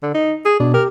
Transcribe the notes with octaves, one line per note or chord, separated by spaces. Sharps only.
D3
D#4
G#4
B2 D4
G4 A#4